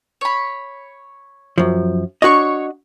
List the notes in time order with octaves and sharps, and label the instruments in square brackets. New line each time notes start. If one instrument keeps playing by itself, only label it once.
[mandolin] C#5 B5
[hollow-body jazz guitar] F#2 F3
[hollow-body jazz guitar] D4 F#4 D#5 [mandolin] C#5 C#6